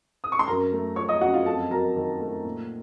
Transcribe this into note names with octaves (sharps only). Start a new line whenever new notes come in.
D#6
C#6
C6
F#2 A#4 A#5
A3
F3 C#5 C#6
D#5 D#6
F#2 F#4 F#5
F4 F5
F2 A4 A5
F#3 A#4 A#5
D#3
A3
A#2